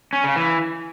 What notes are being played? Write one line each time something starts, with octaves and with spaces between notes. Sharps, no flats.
C#4
C#3
E3